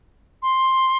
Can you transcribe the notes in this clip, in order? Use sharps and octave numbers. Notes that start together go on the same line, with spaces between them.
C6